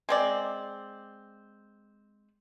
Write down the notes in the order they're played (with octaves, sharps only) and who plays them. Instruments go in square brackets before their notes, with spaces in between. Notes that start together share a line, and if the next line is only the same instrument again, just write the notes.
[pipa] G#3 C4 D5